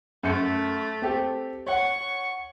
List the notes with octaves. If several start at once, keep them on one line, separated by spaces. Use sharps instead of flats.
F#2 A3 G6 C#7
C4 G4 A4
C#5 F#5 C#6